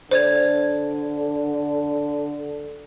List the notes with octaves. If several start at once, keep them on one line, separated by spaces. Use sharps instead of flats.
D3 C5 D5 G#6